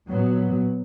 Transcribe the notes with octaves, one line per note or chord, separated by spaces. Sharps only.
A#2 F#3 B3